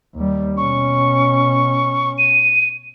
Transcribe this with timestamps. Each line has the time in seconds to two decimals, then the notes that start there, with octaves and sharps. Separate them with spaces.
0.15 D#2 G3
0.57 B2 C#4 C#6
2.18 D#7